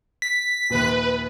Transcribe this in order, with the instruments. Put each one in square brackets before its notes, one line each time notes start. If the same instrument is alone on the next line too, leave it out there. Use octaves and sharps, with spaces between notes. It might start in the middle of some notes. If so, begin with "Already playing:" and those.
[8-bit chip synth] B6
[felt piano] A#1 D#2 [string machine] B4